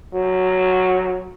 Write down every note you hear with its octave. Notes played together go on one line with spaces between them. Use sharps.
F#3